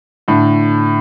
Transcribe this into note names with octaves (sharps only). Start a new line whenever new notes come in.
A2 D3